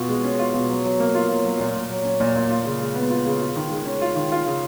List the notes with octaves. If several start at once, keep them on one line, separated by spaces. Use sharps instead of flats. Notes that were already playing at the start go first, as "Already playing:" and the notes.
Already playing: B2 F4
G#3
C#4
F4
B2
F#3
F#3
A#3
F4
F#3
F#3
A#2
A#2
F#3
C#4
A#2
A#2
F4
C#3
G#3
B3
F4
C#3
F4
D#3
G#3
C#4
F4
D#3
F4
C#3